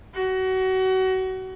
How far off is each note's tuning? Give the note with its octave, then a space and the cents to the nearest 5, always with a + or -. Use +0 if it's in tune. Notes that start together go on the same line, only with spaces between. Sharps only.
F#4 +25